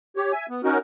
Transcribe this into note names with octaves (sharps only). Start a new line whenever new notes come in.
G4 C#5
E5 G#5
B3
C#4 D#4 F#4 A#4